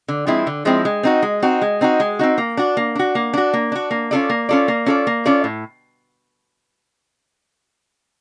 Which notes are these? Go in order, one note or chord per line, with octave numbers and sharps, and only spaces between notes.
D3
F3 G#3 C4 E4
D3
F3 G#3 C4 E4
G#3
C4 D#4 F#4
G#3
C4 D#4 F#4
G#3
C4 D#4 F#4
G#3
C4 D#4 F#4
A#3
D4 F#4
A#3
D4 F#4
A#3
D4 F#4
A#3
D4 F#4
A#3
C#4 F4 A4 D5
A#3
C#4 F4 A4 D5
A#3
C#4 F4 A4 D5
A#3
C#4 F4 A4 D5
A2